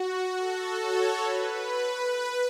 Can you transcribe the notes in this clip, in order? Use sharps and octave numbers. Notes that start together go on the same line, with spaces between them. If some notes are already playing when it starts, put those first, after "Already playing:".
Already playing: F#4
A4
C#5
B4